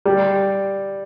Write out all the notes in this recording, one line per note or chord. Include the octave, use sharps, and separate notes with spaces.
G3